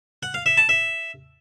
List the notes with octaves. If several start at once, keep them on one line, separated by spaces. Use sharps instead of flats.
F#5
F5
E5
A5
E5